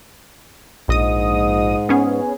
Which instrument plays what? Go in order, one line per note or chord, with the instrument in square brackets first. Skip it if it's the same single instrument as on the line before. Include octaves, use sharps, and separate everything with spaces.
[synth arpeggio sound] A#1 D#5 D#6 [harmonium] G#2
[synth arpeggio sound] B3 C#4 G#4